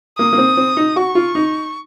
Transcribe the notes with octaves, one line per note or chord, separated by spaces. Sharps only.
A#3 D#6
A#3
C4
C4
D#4
F#4 C#6
F4
D#4